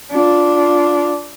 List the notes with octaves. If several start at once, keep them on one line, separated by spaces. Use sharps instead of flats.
D4 F4